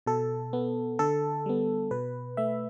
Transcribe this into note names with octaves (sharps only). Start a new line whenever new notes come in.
B2 A4
B3
D3 A4
G3 B3
B2 B4
A3 E5